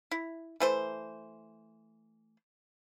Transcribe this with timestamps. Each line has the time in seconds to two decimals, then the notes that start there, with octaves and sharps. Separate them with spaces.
0.11 E4
0.60 E3 A3 C5